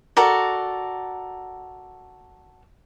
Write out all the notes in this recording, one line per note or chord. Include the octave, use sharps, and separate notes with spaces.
F#4 A4 A#4 D5